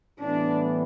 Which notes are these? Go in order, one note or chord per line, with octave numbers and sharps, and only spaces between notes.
A2 E3 G3 B3 D4